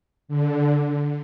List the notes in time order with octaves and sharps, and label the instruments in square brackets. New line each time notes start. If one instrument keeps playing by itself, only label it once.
[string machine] D3